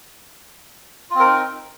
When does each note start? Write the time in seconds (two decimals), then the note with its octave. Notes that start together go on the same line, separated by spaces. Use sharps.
1.10 F4
1.15 C4
1.20 A#4
1.25 D#4